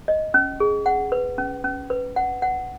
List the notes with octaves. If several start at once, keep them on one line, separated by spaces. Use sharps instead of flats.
D#5
C#4
G#4
F#5
B4
C#4
C#4
B4
F#5
F#5